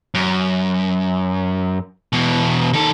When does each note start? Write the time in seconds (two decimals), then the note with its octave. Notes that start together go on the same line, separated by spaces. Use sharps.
0.14 F#2
2.13 E2 B2
2.73 D#3 A4